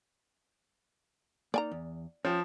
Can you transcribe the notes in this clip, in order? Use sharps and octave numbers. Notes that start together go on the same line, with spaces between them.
A#3 D#4 D5 G#5 A#5
E2
F3 C#4 C#5 G5